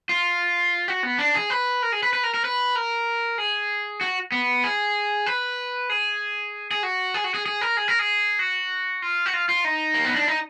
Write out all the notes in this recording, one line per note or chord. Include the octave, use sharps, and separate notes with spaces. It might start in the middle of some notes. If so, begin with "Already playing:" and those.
F4
F#4
B3
D4
G#4
B4
A#4
G#4
B4
B4
A#4
A#4
B4
A#4
G#4
F#4
B3
G#4
B4
G#4
G#4
F#4
G#4
F#4
G#4
G#4
A#4
G#4
A#4
G#4
F#4
F4
F#4
F4
F4
D#4
A#3
B3
D4
D#4